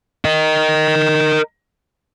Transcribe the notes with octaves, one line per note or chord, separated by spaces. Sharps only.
A#4 D#5